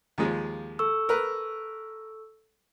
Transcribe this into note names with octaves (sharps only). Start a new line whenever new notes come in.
D#2 F3 G#3
A4 C#6 E6
A#4 B4